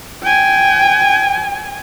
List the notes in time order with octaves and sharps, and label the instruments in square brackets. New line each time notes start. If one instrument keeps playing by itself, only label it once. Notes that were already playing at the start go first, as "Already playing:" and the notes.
[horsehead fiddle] G5 G#5